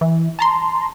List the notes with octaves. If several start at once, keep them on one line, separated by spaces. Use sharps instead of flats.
E3
A5 A#5 C6